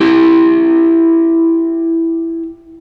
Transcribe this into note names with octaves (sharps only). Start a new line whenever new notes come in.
E4 G4